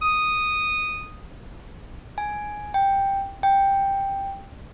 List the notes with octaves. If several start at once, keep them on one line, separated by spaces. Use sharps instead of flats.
D#6
G#5
G5
G5